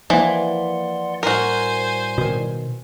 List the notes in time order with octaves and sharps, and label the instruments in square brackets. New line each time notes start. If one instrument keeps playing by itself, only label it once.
[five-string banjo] E3 [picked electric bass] F3 A#3 [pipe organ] D5 F#5 C6
[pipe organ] A2 G3 [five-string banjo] F#4 A#4 [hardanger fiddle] C5 G#5
[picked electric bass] B2 D#3